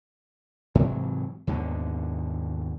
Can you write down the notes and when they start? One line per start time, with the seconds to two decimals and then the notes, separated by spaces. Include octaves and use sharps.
0.75 G#2 C3 E3 F#3
1.47 D#2 G#2 B2 D3